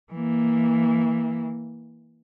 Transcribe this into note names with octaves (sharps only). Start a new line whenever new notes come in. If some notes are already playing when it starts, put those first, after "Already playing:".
E3 A#3